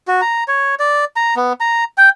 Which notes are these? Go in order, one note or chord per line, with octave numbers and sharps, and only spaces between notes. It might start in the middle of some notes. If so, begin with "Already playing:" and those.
F#4
A#5
C#5
D5
A#5
B3
A#5
G5